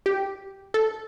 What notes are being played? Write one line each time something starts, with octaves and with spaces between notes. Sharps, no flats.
G4
A4